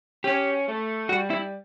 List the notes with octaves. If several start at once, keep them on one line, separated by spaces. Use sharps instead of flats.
C#4 G4
A3
G3 F#4
E4